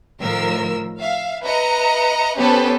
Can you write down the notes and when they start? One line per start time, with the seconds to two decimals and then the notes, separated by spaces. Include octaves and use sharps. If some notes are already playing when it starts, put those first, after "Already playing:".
0.18 A2 D#3 F3 A#4 E6
1.00 E5 F5
1.45 B4 D#5 E5 A#5 C#7
2.38 B3 C#4 G4 A4 B4 C5